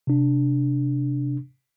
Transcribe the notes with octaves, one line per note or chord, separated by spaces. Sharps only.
C3 D4